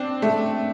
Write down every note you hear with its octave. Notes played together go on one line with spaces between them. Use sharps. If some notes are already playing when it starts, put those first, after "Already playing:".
Already playing: C4 D4
A3